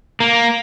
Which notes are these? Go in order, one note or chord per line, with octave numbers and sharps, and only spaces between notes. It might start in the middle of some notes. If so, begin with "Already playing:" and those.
A#3